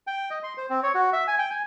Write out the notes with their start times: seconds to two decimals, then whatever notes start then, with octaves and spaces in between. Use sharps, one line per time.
0.07 G5
0.30 D#5
0.43 C6
0.57 C5
0.70 C4
0.83 C#5
0.95 F#4
1.13 E5
1.28 G#5
1.39 G5
1.51 G#5